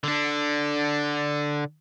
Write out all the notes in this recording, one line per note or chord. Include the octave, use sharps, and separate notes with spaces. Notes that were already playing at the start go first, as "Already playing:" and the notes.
D3 D4